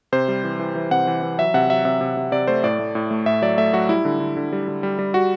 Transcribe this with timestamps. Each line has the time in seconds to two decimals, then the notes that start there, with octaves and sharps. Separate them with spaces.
0.12 C3 C5
0.28 G3
0.44 E3
0.59 E3
0.75 E3
0.91 C3 F#5
1.07 E3
1.23 E3
1.38 F#3 E5
1.54 C3 F#5
1.70 F#3 E5
1.85 C3 E5
2.01 C3
2.17 C3
2.32 C3 D5
2.47 A3 C5
2.63 A2 D5
2.79 A3
2.95 A2
3.11 A3
3.26 A2 E5
3.42 F#3 D5
3.58 A3 E5
3.73 F#3 F#4
3.89 G3 E4
4.05 D3
4.20 D3
4.37 D3
4.52 G3
4.68 D3
4.83 G3
4.99 G3
5.14 G3 F#4